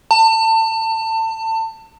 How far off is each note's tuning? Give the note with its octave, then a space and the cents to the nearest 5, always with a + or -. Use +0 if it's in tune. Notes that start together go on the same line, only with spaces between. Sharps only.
A5 +30